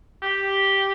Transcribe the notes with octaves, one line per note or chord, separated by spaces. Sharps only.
G4